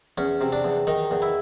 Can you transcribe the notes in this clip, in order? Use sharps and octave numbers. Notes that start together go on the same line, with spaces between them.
E2 C#4
C3
D4
E2
D#3 D#4
E2
E4